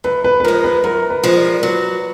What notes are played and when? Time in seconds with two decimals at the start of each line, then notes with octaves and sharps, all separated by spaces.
0.04 F#2 B4
0.24 B4
0.40 B4
0.44 F3 G#3 A#4
0.64 B4
0.84 F#2 A#4
1.10 B4
1.24 F3 G#3
1.37 A#4 D5
1.59 A#4
1.63 F#3 B4